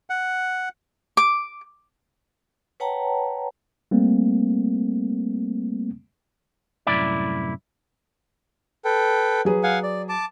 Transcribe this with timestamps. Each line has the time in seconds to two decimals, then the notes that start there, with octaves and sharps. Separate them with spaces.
0.10 F#5
1.17 D6
2.80 B4 C#5 F#5 G5 A5 A#5
3.91 G3 A3 A#3 C4
6.87 C2 F#2 A2 E4 D5
8.85 A4 B4 G5
9.45 F#3 G#4 B4
9.63 F5 F#5 G#5
9.83 D5
10.09 A5 D6